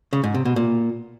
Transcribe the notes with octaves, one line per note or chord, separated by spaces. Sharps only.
C#3
G#2
C3
B2
A#2